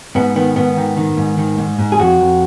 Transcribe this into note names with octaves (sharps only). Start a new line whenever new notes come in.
G#2 B3
D#3 B3
G#2 B3
D#3
D#3
G#2
D#3
G#2
G#2
G#4
F2 F#4
F2